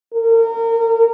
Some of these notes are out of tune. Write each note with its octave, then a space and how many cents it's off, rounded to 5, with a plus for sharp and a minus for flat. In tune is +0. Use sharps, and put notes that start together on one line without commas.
A#4 -30